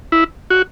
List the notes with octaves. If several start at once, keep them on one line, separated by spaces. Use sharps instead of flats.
E4
F#4